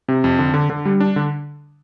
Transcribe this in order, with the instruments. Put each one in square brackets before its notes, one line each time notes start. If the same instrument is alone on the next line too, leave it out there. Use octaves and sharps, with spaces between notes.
[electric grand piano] C3
F2
D3
D3
D3
G3
D4
D3